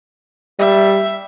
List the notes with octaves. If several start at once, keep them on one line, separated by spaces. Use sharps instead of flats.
G3 E5